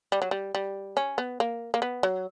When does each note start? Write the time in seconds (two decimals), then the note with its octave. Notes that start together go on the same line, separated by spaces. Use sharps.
0.12 G3
0.22 F#3
0.31 G3
0.55 G3
0.97 C#4
1.18 B3
1.40 A#3
1.74 A#3
1.82 B3
2.03 F#3